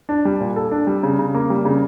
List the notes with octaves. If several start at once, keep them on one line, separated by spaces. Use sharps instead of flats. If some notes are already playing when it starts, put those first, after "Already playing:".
D4
G3
A#2
A4
D4
G3
C#3
C#3
A#3
G3
C#3